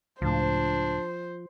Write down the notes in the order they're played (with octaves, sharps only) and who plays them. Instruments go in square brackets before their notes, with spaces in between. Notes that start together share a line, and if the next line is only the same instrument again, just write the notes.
[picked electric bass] C#2 A2 [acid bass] F3 [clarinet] D4 [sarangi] C5